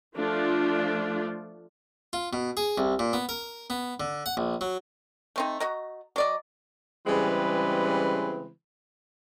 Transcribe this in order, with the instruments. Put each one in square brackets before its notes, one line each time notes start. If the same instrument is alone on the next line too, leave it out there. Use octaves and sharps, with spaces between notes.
[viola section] F3 A3 D4 F4
[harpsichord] F4
B2
G#4
C2
A#2
B3
A#4
B3
D3
F#5
A#1
F#3
[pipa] A3 C4 D#4
F#4 D#5 A#5
F#3 D5 D#5
[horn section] C#3 E3 G3 G#3 C4 B4